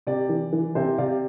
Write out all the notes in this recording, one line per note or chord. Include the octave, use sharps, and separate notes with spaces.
C3 D5
E3
E3
C3 C5 E5
C3 D5 F5